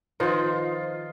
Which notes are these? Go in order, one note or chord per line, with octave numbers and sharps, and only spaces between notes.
D#3 F3 D#4 F4 B4 C5 D#5 C6